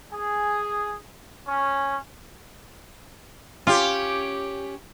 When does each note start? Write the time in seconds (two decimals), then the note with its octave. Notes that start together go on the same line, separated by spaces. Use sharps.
0.11 G#4
1.47 C#4
3.67 C#4 F4 G4